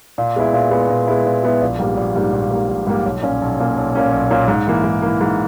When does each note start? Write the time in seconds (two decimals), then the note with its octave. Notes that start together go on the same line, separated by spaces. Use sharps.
0.18 A#2
0.36 G#3 B3 E4
0.53 A#2
0.71 G#3 B3 E4
0.89 A#2
1.07 G#3 B3 E4
1.26 A#2
1.44 G#3 B3 E4
1.61 A#1
1.79 G#2 G3 A#3
1.97 A#1
2.15 G#2 G3 A#3
2.33 A#1
2.51 G#2 G3 A#3
2.68 A#1
2.87 G#2 G3 A#3
3.05 B1
3.22 A#2 A#3 C#4
3.41 B1
3.59 A#2 A#3 C#4
3.76 B1
3.95 A#2 A#3 C#4
4.12 B1
4.31 A#2 A#3 C#4
4.48 G#2
4.67 E3 A#3
4.84 G#2
5.02 E3 A#3
5.21 G#2